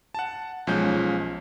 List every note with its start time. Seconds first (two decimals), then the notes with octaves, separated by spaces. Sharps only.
0.15 F#5 A5
0.67 B1 F3 G#3 C#4 G6